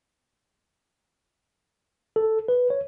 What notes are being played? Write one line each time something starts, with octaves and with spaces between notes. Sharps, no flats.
A4
B4
C#5